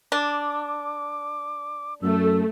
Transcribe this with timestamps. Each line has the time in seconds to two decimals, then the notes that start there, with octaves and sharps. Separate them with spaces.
0.12 D4 D6
2.02 F#2 A3 E6